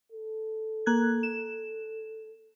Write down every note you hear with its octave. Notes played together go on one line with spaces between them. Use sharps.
A4
A#3 F#6 G#6
E7